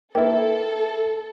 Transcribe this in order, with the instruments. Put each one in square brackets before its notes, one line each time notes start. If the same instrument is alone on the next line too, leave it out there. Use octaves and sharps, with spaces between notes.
[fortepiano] A#3 E4 [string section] A4 [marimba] B4 G5